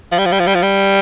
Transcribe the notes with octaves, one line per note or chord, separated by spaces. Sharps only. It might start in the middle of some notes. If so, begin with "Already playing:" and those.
F3
G3
F3
G3
F3
G3
F3
G3